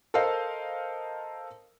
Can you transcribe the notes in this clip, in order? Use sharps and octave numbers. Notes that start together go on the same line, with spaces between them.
A4 A#4 C5 D#5 F5